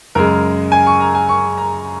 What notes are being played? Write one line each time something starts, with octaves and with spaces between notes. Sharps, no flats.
F#2 C#3 G#3 A#4
G#5
C#6
A#5
G#5
C#6
A#5